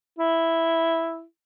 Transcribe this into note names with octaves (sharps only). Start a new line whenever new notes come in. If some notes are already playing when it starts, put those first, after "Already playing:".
E4